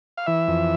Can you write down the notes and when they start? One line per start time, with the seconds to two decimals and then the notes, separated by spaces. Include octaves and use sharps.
0.17 F5
0.26 E3 E5
0.48 F2